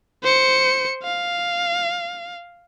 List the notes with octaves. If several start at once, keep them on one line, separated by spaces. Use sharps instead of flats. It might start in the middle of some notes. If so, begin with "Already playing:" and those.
C5 C#7
F5